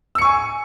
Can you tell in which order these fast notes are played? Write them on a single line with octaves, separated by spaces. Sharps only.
E6 C#7 C#6 G#5